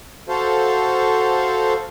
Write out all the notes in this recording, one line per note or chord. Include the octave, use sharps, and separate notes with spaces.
F#4 A4 C5 F5